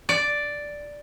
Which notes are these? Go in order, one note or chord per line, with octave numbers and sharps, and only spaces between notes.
D5